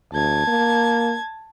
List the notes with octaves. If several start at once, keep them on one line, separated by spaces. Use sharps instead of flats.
D2 A5 G#6
A#3